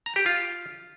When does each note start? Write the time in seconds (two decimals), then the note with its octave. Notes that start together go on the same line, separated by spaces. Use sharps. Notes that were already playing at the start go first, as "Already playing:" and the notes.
0.06 A#5
0.16 G4
0.26 F4